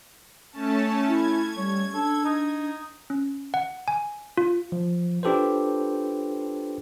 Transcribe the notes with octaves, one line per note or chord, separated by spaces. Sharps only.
A3 C#4 A5
E4 G#6
G3 C#5
D4 A4
D#4
C#4
F#5
G#5
F4
F3
D4 F4 G4 A4 B4 C5